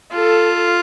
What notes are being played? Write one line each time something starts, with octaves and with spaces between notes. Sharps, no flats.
F4 A4